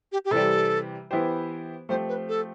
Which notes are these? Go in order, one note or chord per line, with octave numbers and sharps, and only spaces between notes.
G4
G4
C3 E3 G3 A4
E3 B3 E4 G4 C5
F3 A3 C4 G4 C5
B4
A4